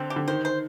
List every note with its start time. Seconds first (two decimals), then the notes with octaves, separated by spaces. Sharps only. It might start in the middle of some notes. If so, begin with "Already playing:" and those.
Already playing: D3 C4
0.10 G4
0.16 D3
0.28 D#3 C5
0.45 C5